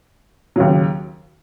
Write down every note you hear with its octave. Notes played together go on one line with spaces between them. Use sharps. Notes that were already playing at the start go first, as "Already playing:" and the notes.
D#2 C#3 F#3